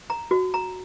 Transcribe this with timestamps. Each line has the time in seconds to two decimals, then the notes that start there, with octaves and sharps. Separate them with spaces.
0.10 A#5
0.31 F#4
0.54 A#5